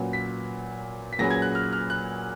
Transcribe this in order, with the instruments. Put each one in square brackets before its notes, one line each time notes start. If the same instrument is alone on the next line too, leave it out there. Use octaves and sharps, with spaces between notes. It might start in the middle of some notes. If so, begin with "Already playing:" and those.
Already playing: [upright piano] A#2 F#3 C#4 F#4 B4
[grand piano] B6
B6
[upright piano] A#2 F#3 C#4 G#4 B4 [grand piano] A#6
[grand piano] G#6
F#6
F6
F6
F#6